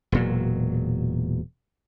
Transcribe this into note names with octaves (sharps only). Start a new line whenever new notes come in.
E1 A#2 F#3